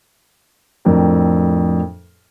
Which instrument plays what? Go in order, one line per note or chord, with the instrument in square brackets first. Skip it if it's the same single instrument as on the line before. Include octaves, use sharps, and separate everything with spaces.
[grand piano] F2 A2 D4 A#4 G5